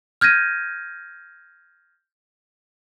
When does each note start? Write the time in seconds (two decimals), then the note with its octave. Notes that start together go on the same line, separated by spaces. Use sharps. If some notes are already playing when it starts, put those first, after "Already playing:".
0.21 F6 G6 G#6 A#6 D#7